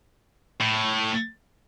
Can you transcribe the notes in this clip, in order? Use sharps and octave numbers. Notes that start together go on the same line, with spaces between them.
A2